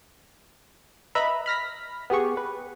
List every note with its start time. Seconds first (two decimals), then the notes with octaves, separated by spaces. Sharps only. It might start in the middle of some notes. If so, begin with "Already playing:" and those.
1.15 B4 D#5 E5 A#5 B5
1.46 B5 F6 A#6 B6
2.10 B3 G4 G#4 C#6
2.37 B4